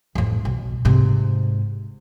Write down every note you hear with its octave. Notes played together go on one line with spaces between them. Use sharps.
A1 F2
B1
G#2 C3